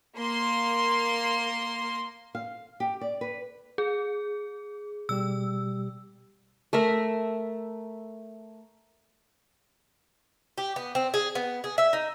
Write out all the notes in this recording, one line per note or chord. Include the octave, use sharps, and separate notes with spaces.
A#3 C6
F5
G4
D5
B4
G#4
B2 G3 G4 E6
A3 A#4 E5
G4
B3
C4
G#4
B3
G#4
E5
D#4